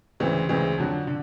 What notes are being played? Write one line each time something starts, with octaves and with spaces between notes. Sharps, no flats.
D2 C#3 E3 G#3 C4
D2 C#3 E3 G#3 C4
F2 D3 F#3
D3